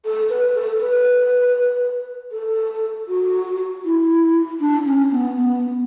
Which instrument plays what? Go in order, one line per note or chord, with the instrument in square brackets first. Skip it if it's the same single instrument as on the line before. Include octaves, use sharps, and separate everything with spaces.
[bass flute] A4
B4
A4
B4
A4
F#4
E4
D4
C#4
B3
B3